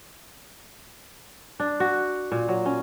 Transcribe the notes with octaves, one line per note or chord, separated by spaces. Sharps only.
D4
F#4
A#2
F#3
C#4